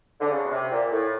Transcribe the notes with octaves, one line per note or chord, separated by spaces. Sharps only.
D3
C#3
B2
C3
A#2
A2